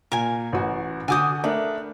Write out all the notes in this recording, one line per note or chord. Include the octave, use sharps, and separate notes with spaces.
A#2 A#4 G#5
A1 F#4
D3 F#4 G#5 D6 D#6 G6
A3 D4 A#4 B4